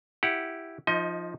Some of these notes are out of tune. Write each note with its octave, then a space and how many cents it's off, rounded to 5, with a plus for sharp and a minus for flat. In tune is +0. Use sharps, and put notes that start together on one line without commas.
E4 +0 G4 +0 F#5 +0
F3 +0 D#4 +0 D#5 +30